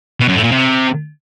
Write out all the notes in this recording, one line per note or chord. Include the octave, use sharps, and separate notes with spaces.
B2
F#2
A2
A#2
C3